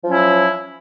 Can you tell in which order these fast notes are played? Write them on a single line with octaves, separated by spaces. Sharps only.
F3 F#3 C#4 E4